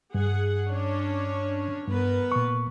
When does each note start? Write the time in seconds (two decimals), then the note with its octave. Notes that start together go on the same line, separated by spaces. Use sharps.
0.14 G2 G#4 F#5
0.69 C#4 D4 C#5
1.88 G2 B3 A#4 B4
2.32 A#2 C#6